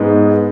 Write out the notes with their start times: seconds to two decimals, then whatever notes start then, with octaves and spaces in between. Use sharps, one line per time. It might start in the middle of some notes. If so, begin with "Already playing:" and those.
Already playing: G#2 G#3 B3